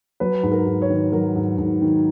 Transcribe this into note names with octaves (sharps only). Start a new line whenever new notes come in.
F#3 B4
G#2
A#4
G#2
C#5
D#3
F#3 A#4
G#2
G#2
D#3